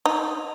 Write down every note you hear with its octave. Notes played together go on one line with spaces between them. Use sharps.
D#4